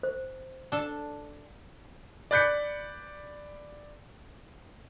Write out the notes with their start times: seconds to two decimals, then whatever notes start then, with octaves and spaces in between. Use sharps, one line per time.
0.03 C5
0.72 D4 A4
2.31 D5 B5 F#6 G6 B6 C#7